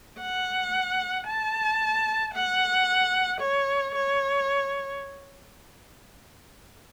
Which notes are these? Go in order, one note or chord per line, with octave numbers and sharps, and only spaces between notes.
F#5
A5
F#5
C#5
C#5